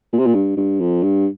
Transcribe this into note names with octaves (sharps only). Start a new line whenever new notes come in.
A#2
C3
A#2
G2
G2
F2
G2